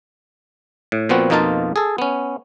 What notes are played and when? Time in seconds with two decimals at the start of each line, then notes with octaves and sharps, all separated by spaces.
0.92 A2
1.09 A#2 F3 B3 C4 F#4
1.30 F2 B2 A#3 D#4 F4 A5
1.76 G#4 A4
1.98 B3 C#4